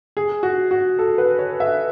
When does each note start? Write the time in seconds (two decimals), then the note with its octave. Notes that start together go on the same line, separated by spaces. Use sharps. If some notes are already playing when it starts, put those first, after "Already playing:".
0.17 G#4
0.43 F#4
0.71 F#4
0.99 A4
1.18 B4
1.39 C#5
1.60 E5